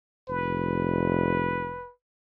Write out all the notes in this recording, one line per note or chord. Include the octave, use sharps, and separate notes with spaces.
F1 B4